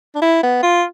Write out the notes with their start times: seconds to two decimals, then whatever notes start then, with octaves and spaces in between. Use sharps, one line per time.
0.15 D4
0.22 E4
0.43 B3
0.63 F4